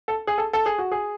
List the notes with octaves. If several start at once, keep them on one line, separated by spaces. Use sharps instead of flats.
A4
G#4
A4
A4
G#4
F#4
G#4